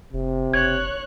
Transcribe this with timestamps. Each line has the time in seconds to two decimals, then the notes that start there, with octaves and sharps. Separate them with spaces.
0.13 F1 C3
0.54 F#1 C#5 F#6 G#6